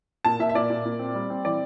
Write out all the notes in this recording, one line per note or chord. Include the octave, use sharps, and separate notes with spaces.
A#2 A5
A#2 E5
E5
A#2 D5
A#2
A#2
C4
G3
C4
E3 D5